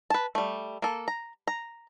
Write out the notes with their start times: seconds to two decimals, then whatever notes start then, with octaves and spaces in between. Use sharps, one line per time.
0.10 B4 A5
0.35 G3 A3
0.82 A#3 A4
1.08 A#5
1.47 A#5